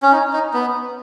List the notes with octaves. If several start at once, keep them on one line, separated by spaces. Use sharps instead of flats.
C#4
D#4
D#4
B3